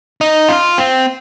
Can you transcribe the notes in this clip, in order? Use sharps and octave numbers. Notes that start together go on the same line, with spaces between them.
D#4
F4
C4